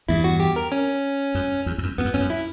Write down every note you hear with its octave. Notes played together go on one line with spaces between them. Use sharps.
E2 G2 E4
F#4
G4
A#4
C#4
F#2
E2
E2
F#2
E2 B3
F#2
E2 C#4
F#2
E4